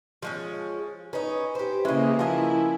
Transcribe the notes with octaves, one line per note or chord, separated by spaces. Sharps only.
F3 G#3 C#4
C#4 D#4 B4
G4 C5
C#3 G#3 A#3 C#4 E4 G#4 D#5
F3 E4 A#4 D#5 G#5